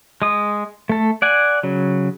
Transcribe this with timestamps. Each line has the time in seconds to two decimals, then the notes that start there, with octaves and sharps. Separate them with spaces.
0.22 G#3 D#6
0.89 A3 A4
1.22 D5 F#5 G#5
1.63 C#3 F#3